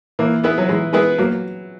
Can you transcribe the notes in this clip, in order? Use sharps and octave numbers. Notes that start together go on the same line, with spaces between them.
E3 A#3
B3 E4 G#4 B4
F#3
E3 G#3
G#3 B3 E4 G#4 B4
F#3 A#3